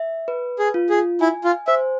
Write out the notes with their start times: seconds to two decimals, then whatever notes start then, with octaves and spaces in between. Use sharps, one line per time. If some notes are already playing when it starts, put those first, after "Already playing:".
Already playing: E5
0.28 B4
0.59 G#4
0.74 F4
0.90 G#4
1.21 E4 G#5
1.44 F4
1.68 C5 E5